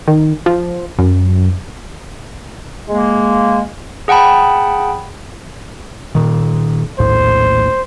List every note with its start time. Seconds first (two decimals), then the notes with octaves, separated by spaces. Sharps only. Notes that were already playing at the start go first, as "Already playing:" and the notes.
0.08 D#3
0.46 F3
0.99 F#2
2.89 G#3 A#3
4.08 G#4 F#5 G5 A5 B5
6.15 A#2 D#3
6.99 A#1 D#2 A2 C5